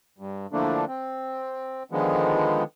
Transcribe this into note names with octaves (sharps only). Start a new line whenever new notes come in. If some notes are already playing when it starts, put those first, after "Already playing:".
G2
D3 E3 F3 A3 A#3 D4
C4
D3 D#3 F3 G#3 B3